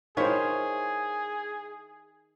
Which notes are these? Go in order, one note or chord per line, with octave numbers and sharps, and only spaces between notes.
D#3 E4 F4 G#4 C5 C#5